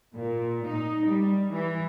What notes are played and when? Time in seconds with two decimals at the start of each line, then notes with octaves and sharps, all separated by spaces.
0.13 A#2
0.66 D#4
1.05 G3
1.50 E3